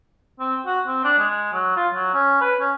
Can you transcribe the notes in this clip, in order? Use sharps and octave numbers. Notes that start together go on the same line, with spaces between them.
C4
F#4
C4
D4
G#3
F#3
F4
F#3
C#4
B4
C#4